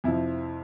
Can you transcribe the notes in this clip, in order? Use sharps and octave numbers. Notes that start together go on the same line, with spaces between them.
F2 C3 F3 E4